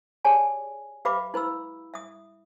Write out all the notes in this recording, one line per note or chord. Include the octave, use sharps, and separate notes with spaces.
G4 G#4 C#5 D5 G#5 A5
G4 B4 E5 F5 B5 D6
E4 B4 B5 E6
E5 D#6